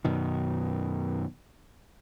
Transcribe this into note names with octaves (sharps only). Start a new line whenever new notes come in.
F#2 B2 D#3